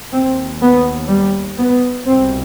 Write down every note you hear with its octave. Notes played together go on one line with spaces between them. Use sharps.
D#2 C4
B3
G3
B3
C2 B2 C4